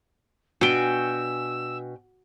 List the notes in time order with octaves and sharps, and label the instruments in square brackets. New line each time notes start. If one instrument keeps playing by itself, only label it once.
[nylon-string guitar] B2 D4 [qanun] F#4 [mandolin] G5 G#5 [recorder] E6